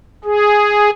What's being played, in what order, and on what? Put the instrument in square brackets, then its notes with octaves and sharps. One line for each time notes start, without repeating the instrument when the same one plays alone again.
[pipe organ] G#4